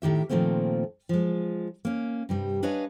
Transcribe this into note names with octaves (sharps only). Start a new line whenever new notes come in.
A2 D#3 G4 E5
A#2 D#3 F3 A3 A#3 C4
F3 G#3
A#3 C#4
G2 C3 G3
D4 B4 C#5 D#5 F5 G#5